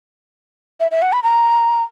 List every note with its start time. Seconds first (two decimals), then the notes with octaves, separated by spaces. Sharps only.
0.80 E5
0.91 E5
1.02 F#5
1.13 B5
1.23 A#5